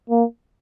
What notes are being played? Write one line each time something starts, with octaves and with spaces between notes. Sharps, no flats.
A#3